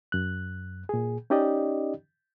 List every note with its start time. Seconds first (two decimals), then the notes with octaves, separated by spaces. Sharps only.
0.12 F#2 F#6
0.89 A#2 G#4
1.30 C#4 D#4 G4 D5 D#5